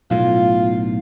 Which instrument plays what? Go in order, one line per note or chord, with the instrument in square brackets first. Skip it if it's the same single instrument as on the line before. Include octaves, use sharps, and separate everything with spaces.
[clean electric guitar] B1 A2 [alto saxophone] F4